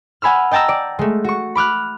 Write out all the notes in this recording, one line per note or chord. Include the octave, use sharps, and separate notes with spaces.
F#5 G#5 B5 E6 F6
D#5 G5 A5 A#5 E6
D5
G#3 A3
F#4 C#6
B5 D6 F6 F#6